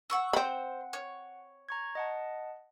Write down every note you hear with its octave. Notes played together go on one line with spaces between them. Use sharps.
F#5 C#6 E6
C4 C5 F#5 B5
C#5
A#5 C#6 G#6
D#5 F#5 A5